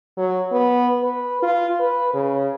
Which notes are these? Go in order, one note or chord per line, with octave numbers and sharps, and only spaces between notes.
F#3
B3
B4
F4
B4
C#3